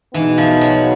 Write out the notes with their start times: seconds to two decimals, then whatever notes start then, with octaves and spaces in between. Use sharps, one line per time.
0.14 B2 E3 G#3 B3 D#4
0.38 F3
0.61 F#3